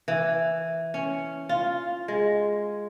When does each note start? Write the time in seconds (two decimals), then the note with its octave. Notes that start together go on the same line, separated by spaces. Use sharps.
0.08 E3
0.94 C#4
1.49 F4
2.08 G#3